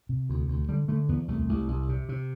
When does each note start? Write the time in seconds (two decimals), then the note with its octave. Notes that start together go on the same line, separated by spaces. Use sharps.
0.09 C3
0.29 D2
0.48 D2
0.69 D3 G3
0.88 D3 A3
1.09 E2 B3
1.28 C2 A3
1.49 C2
1.69 C2
1.89 C3
2.09 C3